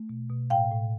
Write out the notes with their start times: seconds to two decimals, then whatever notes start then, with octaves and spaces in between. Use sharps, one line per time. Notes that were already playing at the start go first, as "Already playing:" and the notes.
Already playing: A3
0.09 B2
0.30 B2
0.50 A2 F5 G5
0.71 A2